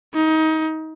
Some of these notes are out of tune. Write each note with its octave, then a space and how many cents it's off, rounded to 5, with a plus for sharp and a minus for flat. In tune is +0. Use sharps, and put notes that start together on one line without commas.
D#4 +25